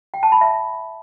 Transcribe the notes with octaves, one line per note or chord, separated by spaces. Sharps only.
G5
A5
B5
E5